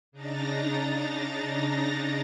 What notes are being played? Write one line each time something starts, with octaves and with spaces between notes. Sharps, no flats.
C#3 D4 D#4 A#5 A6 A#6